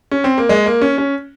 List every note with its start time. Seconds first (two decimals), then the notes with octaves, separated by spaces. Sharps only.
0.11 C#4
0.24 C4
0.38 A#3
0.49 G#3
0.66 A#3
0.81 C#4
0.98 C#4